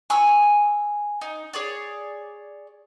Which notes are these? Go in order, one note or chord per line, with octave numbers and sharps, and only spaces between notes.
G#5 C#6 D#6 E6
D#4
G#4 C#5 D5